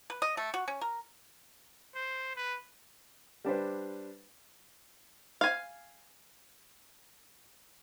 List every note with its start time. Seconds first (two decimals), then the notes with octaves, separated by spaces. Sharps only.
0.10 B4
0.22 D#5
0.37 A3
0.54 F#4
0.68 C#4
0.81 A#4
1.95 C5
2.36 B4
3.45 G3 D4 B4 C5
5.41 F5 G#5